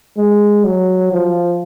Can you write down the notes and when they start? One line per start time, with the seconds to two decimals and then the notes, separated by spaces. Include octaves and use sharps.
0.17 G#3
0.64 F#3
1.12 F3